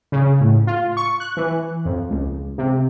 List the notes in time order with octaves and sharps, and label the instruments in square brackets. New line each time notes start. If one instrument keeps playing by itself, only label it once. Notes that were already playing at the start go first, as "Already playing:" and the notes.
[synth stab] C#3
A2
F4
C#6
F#6
E3
F2
C#2
C3